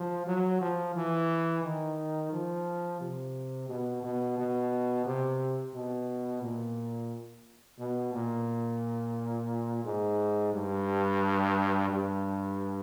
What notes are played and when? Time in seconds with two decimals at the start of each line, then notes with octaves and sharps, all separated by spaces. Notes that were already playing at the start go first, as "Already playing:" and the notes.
Already playing: F3
0.27 F#3
0.61 F3
0.96 E3
1.64 D#3
2.32 F3
3.00 C3
3.69 B2
4.03 B2
4.38 B2
5.06 C3
5.74 B2
6.42 A#2
7.79 B2
8.13 A#2
9.84 G#2
10.53 G2
11.89 G2